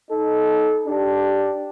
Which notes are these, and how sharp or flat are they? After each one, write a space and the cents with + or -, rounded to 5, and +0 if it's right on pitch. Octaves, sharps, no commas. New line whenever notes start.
D#4 +0 A4 -25
D4 +0 G4 +0